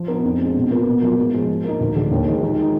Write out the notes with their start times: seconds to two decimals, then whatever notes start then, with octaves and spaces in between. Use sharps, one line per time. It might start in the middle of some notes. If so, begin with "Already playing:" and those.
Already playing: F3
0.08 B3 D#4 A#4
0.24 F2
0.39 F3 G#3 D4
0.55 B2
0.71 A#3 F4 B4
0.86 B2
1.02 F#3 A#3 F4 B4
1.17 G#2
1.33 F3 G#3
1.49 F3
1.64 A#3 D#4
1.80 D2
1.96 D3 G#3 D4
2.11 D#2
2.27 D#3 G#3
2.42 D#3
2.58 G#3 D#4